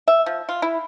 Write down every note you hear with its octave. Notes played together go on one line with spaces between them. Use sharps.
E5
F3
F4
E4